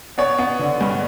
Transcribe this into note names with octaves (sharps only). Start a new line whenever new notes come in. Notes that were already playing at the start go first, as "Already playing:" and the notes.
B3 C#5
B3
D3
G2